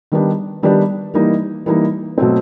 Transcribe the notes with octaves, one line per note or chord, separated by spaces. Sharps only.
D#3 G3 B3 D4 G4
D#3 G3 B3 D4 G4
E3 G3 A#3 D#4
E3 G3 A#3 D#4
B2 F#3 A3 C4